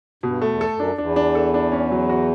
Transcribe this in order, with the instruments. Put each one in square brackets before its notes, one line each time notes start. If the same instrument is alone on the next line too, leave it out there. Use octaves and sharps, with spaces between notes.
[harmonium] G2 [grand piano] B2
[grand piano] A3
[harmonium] E2
[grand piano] A4
[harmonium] F#2
[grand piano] D4
[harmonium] E2 [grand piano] D4
[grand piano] D4
A4
D4
C#4
F#3
F#4